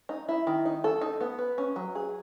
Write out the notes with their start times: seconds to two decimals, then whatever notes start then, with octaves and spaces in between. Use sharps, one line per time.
0.09 D#4
0.29 E4
0.47 D#3
0.65 D#4
0.84 A4
1.02 D#4
1.21 B3
1.39 B4
1.58 C#4
1.76 F#3
1.95 G#4